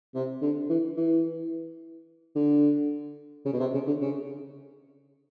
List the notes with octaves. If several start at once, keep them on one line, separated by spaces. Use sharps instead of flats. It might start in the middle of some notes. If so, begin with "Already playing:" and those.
C3
D3
E3
E3
D3
C#3
B2
C3
C#3
D3
C#3